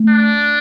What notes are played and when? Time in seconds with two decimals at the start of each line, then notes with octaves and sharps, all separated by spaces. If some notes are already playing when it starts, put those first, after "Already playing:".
Already playing: A3
0.08 D4